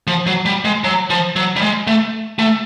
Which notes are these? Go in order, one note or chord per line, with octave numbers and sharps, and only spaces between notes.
F3
F#3
G3
G#3
F#3
F3
F#3
G3
G#3
A3
A3